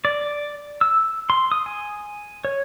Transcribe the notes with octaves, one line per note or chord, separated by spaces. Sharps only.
D5
E6
C6
D#6
G#5
C#5